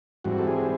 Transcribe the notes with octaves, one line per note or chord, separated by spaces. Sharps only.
G#2 E3 G3 C4 F#4
A4
G#4